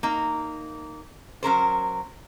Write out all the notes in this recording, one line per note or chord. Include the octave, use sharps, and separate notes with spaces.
A#3 D#4
F#3 C#4 A#4 C5